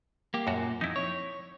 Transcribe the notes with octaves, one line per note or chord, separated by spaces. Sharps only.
A#3 G4
F#2 A#2 F#4
F2 D#4 E4
C#5